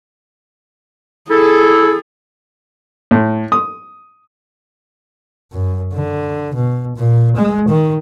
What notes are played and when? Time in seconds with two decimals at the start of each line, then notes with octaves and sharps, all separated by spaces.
1.30 E4 G#4 A4
3.11 A2
3.52 D#6
5.53 F#2
5.93 D3
6.55 B2
6.97 A#2
7.37 G#3
7.69 D#3